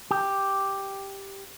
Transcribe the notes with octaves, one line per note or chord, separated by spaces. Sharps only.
G4